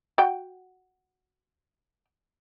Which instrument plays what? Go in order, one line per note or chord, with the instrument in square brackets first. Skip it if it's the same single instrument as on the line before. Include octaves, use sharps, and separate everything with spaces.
[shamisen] F#4 G5